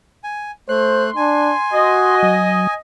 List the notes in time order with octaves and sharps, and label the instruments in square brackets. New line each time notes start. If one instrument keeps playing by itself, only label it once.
[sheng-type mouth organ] G#5
[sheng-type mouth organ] A3 F#6 [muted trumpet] C5 [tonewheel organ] C6
[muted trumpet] D4 [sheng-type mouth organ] G#5
[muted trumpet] F#4 [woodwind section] D#5
[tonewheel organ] F#3